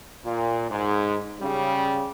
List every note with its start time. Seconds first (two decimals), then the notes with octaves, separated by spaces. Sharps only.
0.24 A#2
0.70 G#2
1.41 C#3 G3